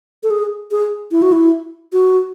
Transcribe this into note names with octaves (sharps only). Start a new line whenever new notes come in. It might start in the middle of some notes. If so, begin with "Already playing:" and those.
A4
G#4
G#4
E4
F#4
E4
F#4